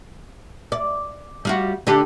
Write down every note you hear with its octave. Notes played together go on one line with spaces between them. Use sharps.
D5
G3 F4 F#4
D3 D4 G4